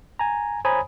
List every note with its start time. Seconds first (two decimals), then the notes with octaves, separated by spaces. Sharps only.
0.19 G#5 A#5
0.65 C5 C#5 G#5 A#5 B5 D#6